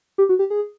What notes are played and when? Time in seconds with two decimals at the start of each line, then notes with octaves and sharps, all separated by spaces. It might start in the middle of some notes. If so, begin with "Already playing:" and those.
0.18 G4
0.29 F#4
0.39 G4
0.50 G#4